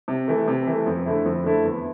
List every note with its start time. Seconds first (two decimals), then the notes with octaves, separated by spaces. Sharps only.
0.08 C3
0.28 E3 A3
0.48 C3
0.67 E3 A3
0.86 F2
1.05 D3 A3 E4
1.25 F2
1.44 D3 A3 E4
1.64 E2